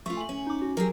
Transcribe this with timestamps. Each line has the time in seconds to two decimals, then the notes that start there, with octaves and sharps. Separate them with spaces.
0.06 A3 F4 C#6
0.17 G#5 F#7
0.29 C#4
0.47 D#4 D6
0.62 F#4
0.77 F#3 G4 G#4 A#4